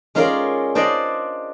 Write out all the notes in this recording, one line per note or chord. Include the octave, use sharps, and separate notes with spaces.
G#3 C#4 F4 A#4 D5
D4 C5 D5 D#5